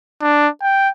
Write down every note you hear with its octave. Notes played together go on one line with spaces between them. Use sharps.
D4
G5